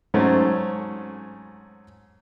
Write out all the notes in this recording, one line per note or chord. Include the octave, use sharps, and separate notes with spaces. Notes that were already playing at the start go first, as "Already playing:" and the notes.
G#2 F#3 A3 C4 C#4